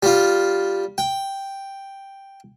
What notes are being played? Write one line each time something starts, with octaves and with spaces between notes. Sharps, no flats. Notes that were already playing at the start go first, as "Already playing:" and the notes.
G3 F4
G5